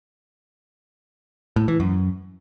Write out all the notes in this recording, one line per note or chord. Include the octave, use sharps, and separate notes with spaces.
A2
E3
F#2